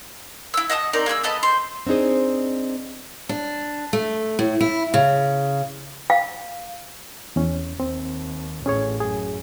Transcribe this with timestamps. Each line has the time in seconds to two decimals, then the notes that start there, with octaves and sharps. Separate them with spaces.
0.54 E4 E6
0.70 D#5 F#5 A5 D#6
0.93 C4 D#4 A#4 D5
1.06 A#3 G#4 C#6 E6
1.24 B3 A4 D#5 B5
1.43 C5
1.87 C4 D4 D#4 G#4 C5
3.29 D4
3.93 A3
4.39 A2
4.61 E4
4.94 C#3
6.10 F5
7.36 E2 C#4
7.80 D#2 C4
8.66 A1 C#4 G#4 C#5
9.01 F#2 G#4